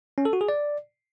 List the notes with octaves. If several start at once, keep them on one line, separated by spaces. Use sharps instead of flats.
C#4
A4
F#4
G#4
D5